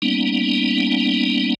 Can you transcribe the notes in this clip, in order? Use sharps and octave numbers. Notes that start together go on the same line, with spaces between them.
G3 A#3 B3 C#4 D#4